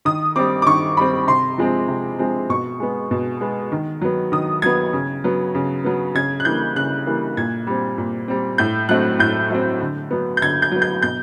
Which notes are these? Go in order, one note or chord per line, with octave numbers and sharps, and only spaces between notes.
D#3 D#6
G3 C4 D6
D6
D#3 C#6
G3 C4 B5
C3 C6
F3 G#3 C4
C3
F3 G#3 C4
B2 C#6
G#3 B3
B2
G#3 B3
D#3
F#3 B3
D#3 D#6
F#3 B3 G#6
C#3
F#3 B3
C#3
F#3 B3
C#3 G#6
F#6
E3 G3 A#3 G6
C#3 F#6
E3 G3 A#3
A#2 G#6
G3 C4
A#2
G3 C4
A2 G6
F#3 A3 C4 F#6
A2 G6
F#3 A3 C4
D3
F#3 B3
G6
D3 G#6
G6
F#3 B3
G6
B2 G6